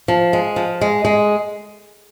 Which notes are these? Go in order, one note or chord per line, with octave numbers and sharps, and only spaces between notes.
F3
G#3
F3
G#3
G#3